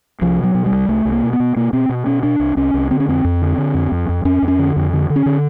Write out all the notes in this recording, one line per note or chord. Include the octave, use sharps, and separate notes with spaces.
C2 F3
B2 F#3
B2
G3
C2
C2 A3
C2
A#3
B2
B3
B2
B2 A#3
B2 C4
B2
B2 C#4
B2 D4
C2
C2 C#4
C2
D3 C4
C#4
F2 C4
F2
D3
D3
F2
F2
F2
F2 C#4
F2
C#4
D3
F2
D3
D3
C#4
D3